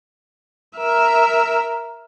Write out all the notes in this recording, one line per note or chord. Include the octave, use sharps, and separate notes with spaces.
A#4 E5